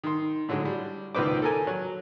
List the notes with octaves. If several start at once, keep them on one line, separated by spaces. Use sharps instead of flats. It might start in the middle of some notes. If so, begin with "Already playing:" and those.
D#3 C6
A2 D3 F#3 G#3
G3
C#2 A#2 D#3 B4 C5 D6
A4 A#4 G#5
F#3